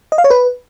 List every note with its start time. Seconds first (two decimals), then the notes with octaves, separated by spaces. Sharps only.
0.12 D#5
0.18 F5
0.24 C#5
0.30 B4